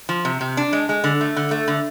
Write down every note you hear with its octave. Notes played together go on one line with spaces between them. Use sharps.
F3
C3
C3
D4
G#3
G#3
D3
A3
D3
A3
D3